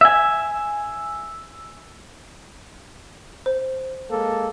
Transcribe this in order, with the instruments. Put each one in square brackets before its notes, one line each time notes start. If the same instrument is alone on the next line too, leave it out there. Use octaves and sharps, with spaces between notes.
[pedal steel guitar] E5 G#5
[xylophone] C5
[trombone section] G#3 A#3 A4